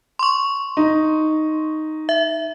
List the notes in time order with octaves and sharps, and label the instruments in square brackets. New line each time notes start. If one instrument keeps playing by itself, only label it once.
[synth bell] C6 C#6
[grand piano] D#4
[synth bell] E5